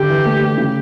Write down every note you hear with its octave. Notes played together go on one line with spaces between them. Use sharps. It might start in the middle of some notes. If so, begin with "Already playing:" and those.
Already playing: D3 G4
E3
A3
A3
C#3